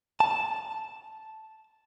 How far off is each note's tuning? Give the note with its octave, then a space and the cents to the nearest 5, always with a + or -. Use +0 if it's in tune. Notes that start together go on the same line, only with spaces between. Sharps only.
A5 -5